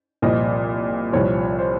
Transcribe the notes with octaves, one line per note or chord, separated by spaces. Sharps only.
C2 A#2 F3 D#5
C2 A#2 F3 C#5
C5